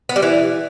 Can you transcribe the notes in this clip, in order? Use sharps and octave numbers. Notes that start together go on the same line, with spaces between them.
B3
G3
E3